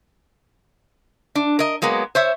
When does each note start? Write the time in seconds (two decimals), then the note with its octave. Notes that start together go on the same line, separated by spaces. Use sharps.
1.35 D4
1.59 A#4 D#5
1.82 F#3 G#3 A#3 B3
2.15 C5 C#5 E5